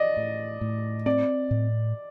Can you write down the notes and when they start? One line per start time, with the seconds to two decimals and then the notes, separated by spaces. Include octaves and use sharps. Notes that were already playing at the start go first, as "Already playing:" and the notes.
Already playing: D5 D#5
0.17 A2
0.61 A2
1.06 C4 D5
1.51 A2